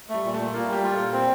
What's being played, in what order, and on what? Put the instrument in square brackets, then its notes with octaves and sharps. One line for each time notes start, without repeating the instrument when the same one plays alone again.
[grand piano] G3 [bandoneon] A3
[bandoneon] A#2
[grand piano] A3
[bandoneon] A#2
[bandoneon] A#3 [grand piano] F4
[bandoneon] G3 [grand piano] G4
[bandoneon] F4
[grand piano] A4
[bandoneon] A#2
C4